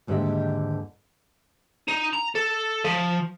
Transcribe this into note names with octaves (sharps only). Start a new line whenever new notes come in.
D#2 G#2 D3 G4 D#5 E5
D#4
A#5
A4
F3